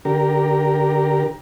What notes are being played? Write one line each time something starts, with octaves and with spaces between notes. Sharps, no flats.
D3 G4 A#4